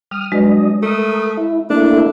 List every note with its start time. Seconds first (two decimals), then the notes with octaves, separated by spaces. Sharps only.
0.11 G3 D#6 F6
0.32 F#3 G#3 D4 B4 D#5
0.83 A3 A#4 E5 D#6
1.37 E4
1.70 A3 A#3 D4 E4